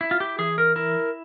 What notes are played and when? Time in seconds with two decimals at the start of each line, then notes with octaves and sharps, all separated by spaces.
0.01 E4
0.11 F4
0.20 G4
0.39 E3 G#4
0.58 A#4
0.76 E4 A#4